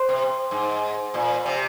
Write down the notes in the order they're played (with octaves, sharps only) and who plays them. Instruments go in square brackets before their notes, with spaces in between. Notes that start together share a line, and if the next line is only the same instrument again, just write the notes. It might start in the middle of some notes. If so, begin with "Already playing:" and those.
Already playing: [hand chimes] C5 C6
[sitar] C3
G#2
A#2
C3